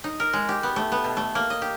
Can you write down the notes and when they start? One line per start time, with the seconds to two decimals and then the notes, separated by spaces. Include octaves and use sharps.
0.04 D#4
0.20 A#4
0.33 G#3
0.49 G4
0.63 B3
0.76 A3
0.92 B3
1.04 B2
1.17 A3
1.35 A#3
1.50 D#5
1.62 G4